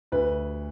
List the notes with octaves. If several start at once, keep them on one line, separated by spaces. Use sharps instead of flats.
D2 B4